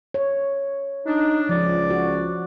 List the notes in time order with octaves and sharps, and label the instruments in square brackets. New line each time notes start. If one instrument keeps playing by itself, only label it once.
[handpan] C#5
[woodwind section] D4 [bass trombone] D#4
[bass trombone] C#2 [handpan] F3 [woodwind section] D5
[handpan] F#4